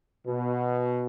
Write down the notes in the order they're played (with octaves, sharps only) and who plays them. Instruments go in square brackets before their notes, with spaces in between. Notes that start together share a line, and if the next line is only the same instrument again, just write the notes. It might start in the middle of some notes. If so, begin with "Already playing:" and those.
[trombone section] B2